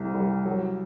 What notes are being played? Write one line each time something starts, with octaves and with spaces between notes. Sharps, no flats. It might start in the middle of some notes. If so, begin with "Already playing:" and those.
Already playing: C2 C3
G3
F#3